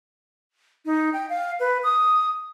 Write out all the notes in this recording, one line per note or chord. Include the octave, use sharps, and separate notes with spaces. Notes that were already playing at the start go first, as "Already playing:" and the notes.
D#4
G5
F5
B4
D#6